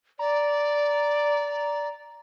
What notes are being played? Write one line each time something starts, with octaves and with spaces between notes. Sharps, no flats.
D5 A#5